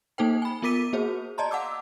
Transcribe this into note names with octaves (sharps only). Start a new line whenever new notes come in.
A#3 D#4 A4 C5 G5
G#5 B5
B3 F4 A#4 D6 B6 D#7
A#3 F#4 G#4 C5
D5 D#5 A5 A#5 C6
F5 F#5 A5 D6 E6